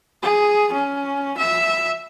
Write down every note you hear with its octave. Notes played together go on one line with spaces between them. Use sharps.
G#4
C#4
E5